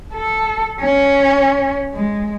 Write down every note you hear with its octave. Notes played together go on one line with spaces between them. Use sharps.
A4
C#4
G#3